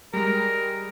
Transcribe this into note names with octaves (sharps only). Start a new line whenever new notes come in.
G3 G#3 A#4